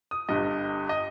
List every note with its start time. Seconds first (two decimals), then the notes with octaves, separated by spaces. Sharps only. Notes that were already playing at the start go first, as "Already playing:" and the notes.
0.11 D#6
0.29 G1 G2 G3 D#5
0.89 D#5